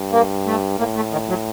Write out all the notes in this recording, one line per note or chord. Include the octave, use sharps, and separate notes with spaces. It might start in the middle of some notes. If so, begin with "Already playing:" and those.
Already playing: G2
A#3
A3
A2 A#3
A3
D#3
F#3